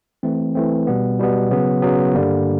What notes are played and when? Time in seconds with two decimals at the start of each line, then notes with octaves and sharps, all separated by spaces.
0.23 E3 A3 C4
0.55 E3 A3 C4
0.87 B2 G3 B3
1.19 B2 G3 B3
1.51 C#3 F#3 B3
1.83 C#3 F#3 B3
2.14 G2 D3 G3 A#3